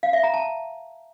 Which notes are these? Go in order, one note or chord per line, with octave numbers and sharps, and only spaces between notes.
F5
E5
A#5
A5